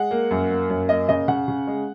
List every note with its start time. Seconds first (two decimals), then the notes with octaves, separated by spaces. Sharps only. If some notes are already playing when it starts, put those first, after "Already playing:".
Already playing: G#3 F#5
0.11 A#3
0.31 F#2
0.50 A#3
0.70 F#2
0.89 A#3 D#5
1.09 C#3 D#5
1.28 C#3 F#5
1.48 C#3
1.67 G#3